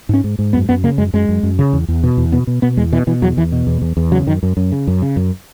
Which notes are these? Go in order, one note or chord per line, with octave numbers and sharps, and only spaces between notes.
G#2 C#4
G#2
G#2
F#2 B3
F#2 B3
C#3 A#3
F#2 G#3
F#2 G#3
F#2
F#2
C#3
E2
E2
B2
E2
B2 B3
B2
B2 B3
E2 G#3
B2 E3
B2 E3
E2 F#3
E2 E3
B2
E2
E2
E2
C#3 F#3
F#2 D#3
F#2
F#2
C#3
F#2
C#3
F#2